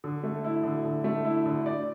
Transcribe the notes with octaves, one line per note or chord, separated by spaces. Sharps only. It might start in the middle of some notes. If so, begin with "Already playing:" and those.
D3
A3
E4
D3
D3
A3
E4
D3
D5